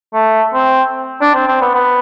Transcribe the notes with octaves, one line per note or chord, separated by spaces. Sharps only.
A3
C4
D4
C4
C4
B3
B3